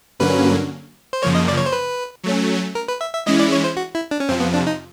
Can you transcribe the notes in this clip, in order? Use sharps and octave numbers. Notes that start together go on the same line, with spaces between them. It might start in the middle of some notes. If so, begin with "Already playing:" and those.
G2 D3 F#3 A#3 C#4 B4
C5
F#2 C#3 F3 A#3 C#5
D#5
D5
C#5
C5
B4
F#3 A3 C#4
A#4
B4
E5
E5
E3 G#3 C#4 E4 D#5
D5
C#5
C5
F#4
E4
D4
C#4
F2 C3 F3 C4
B3
D4
D#4